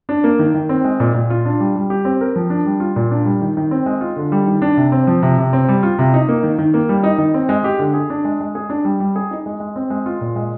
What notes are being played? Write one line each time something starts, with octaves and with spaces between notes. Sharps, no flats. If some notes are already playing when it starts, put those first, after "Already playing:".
D4
A#3
D#3
D#3
C4
G#3
A#2
A#2
F4
D4
G3
G3
G4
C4
A#4
F3
D4
G3
F4
A#2
D4
G3
D#3
D#3
C4
G#3
F4
D3
G3
D#3
D4
C3
C4
F3
C3
C3
C4
G3
F4
C3
D#4
A#3
D#3
D#3
A#3
G3
D#4
D#3
C4
G#3
G4
D3
G#4
D4
G#3
G#3
G#4
D4
G3
G3
G#4
D#4
G#3
G#3
C4
G#3
F4
A#2
G#3